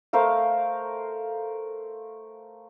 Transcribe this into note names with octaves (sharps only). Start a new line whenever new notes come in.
A3 A#4 C5 F5